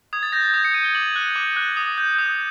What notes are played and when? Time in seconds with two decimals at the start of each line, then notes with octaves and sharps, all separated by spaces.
0.13 D#6 G#6
0.23 A6
0.32 G6 A#6
0.43 A6
0.53 D#6 G#6
0.65 C#7
0.74 G6 D#7
0.84 G7
0.95 D6 F#7
1.16 F#6
1.36 D6
1.56 F#6
1.77 D#6
1.98 G6
2.18 D#6